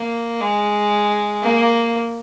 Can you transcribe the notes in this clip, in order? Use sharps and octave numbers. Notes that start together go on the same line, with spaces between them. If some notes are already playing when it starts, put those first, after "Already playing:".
Already playing: A#3
G#3
A#3